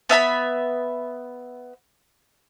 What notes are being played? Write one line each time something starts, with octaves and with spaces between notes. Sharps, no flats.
B3 E5 A5 B5